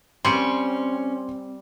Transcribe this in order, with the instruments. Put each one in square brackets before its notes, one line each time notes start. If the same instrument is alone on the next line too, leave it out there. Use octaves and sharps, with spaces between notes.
[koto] G3 [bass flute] C4 [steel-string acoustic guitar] C#4 [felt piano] C6 C#7